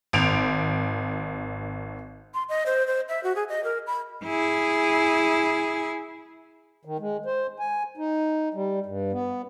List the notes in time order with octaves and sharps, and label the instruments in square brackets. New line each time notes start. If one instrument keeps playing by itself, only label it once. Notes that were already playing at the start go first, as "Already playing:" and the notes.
[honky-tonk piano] G#1 D7 F7
[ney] C6
D#5
C5
C5
E5
F#4
G#4
D#5
A#4
B5
[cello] E4 G#4
[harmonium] D#3
G#3
C5
G#5
D#4
G3
G2
B3